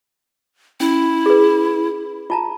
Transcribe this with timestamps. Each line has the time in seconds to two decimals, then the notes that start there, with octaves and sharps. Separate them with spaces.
0.80 C#4 E4
1.26 G#4 B4
2.30 F4 A5 A#5